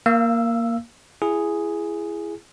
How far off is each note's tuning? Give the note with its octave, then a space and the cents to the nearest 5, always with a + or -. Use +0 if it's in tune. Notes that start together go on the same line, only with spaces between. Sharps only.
A#3 +0 F5 -25 E6 +0
E4 +25 G#4 +0